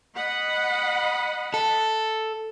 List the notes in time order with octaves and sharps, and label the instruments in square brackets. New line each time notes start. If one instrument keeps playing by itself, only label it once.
[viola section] D#5 F#5 B5
[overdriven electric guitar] A4